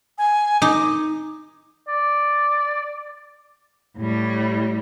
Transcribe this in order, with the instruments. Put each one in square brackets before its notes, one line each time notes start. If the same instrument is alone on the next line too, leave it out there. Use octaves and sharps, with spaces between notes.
[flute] G#5
[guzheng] D#4 [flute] D6
[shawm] D5
[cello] A2 G3